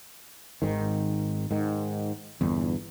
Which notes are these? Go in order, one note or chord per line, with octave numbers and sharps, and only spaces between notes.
G#1 G#2 D#3
G#2 D#3
G1 E2